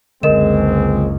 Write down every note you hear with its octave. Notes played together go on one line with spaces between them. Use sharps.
F#1 C#2 D3 G#3 C4 A#4 D#5 E7